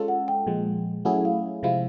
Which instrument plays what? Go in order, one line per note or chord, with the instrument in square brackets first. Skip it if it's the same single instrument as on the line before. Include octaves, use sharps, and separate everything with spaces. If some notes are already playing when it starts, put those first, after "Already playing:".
Already playing: [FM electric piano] G#3 C#4 F4 A4
[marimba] F#5
G5
[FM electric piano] A#2 F3 G#3
[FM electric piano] F#3 A3 C#4 E4 G#4 [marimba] F#5
[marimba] F5
[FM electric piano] C3 F3 G#3 C4 E4 [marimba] F5